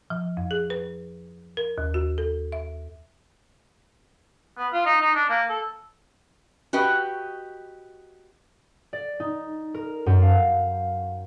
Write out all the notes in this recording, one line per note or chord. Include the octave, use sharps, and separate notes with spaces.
F3
F2
G#4
B4
A#4
D#2
F#4
A4
E5
B3
F4
D#4
D#4
D4
A#3
A4
F#4 G4 B4 D#5
D5
D#4
A#4
F#2
F5